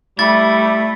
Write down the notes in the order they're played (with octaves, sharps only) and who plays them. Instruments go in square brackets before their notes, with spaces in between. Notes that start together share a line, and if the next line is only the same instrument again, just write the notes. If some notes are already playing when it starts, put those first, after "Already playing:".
[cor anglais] G3 [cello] A3 [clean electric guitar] E4 [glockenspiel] A6